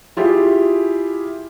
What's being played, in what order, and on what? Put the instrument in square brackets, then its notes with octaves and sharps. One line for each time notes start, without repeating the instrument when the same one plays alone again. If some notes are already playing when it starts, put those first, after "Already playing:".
[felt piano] E4 F4 G4 G#4